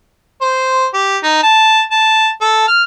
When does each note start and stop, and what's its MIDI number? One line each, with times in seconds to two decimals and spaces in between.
0.41 0.86 72
0.94 1.18 67
1.23 1.39 63
1.43 1.82 81
1.91 2.29 81
2.41 2.67 69
2.68 2.83 89